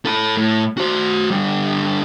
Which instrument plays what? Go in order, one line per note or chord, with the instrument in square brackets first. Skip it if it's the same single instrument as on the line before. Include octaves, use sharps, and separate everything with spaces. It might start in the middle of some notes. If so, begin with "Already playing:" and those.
[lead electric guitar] A4 B5
A2
F#4 C5
D3 G3